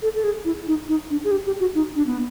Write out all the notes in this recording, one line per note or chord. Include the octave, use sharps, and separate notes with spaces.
A4
A4
G#4
E4
D#4
D#4
D4
G#4
G4
G4
F#4
D#4
D4
B3